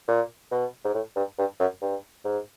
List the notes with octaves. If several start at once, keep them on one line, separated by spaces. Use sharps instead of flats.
A#2
B2
G#2
A2
G2
G2
F#2
G2
G#2